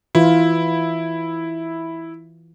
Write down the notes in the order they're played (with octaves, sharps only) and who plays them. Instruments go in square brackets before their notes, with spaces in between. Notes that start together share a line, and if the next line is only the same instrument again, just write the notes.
[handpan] E3 F4 [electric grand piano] E4